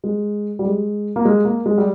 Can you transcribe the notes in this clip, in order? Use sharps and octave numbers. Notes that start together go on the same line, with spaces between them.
G#3
G3
G#3
A#3
G#3
A#3
G#3
G3